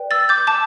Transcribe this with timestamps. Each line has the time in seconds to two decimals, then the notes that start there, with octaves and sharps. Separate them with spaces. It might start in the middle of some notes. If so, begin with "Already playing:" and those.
Already playing: B4 D5 G5
0.11 E6 A6
0.29 D6 G6
0.47 A5 D6